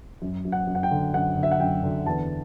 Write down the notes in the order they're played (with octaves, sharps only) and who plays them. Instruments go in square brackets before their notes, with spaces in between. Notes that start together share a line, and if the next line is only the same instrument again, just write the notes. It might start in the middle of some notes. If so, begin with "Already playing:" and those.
[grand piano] F#2
F#2
F#5
F#2
F#5
G5
D3
F#2 F#5
D3
E5
F#5
F#2 G5
D3
E2 A5